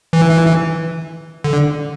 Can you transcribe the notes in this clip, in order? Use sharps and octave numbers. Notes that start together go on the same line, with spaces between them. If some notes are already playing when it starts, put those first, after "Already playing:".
E3
D3